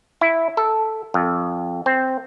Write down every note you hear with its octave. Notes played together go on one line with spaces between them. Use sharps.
E4
A4
F2
C4